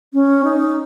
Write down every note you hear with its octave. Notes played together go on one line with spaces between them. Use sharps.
C#4
D#4